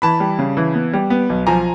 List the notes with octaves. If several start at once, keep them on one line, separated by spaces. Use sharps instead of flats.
E3 A5 B5
G3
C#3
E3
B3
G3
B3
B1
F3 G#5 A#5